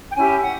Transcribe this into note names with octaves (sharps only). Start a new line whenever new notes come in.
G5
C#4 E4 G4 G#5
F#5